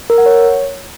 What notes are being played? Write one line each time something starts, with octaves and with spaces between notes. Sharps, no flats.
A#4
F#5
C#5